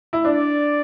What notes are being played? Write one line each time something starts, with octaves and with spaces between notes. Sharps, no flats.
E4
D4 D5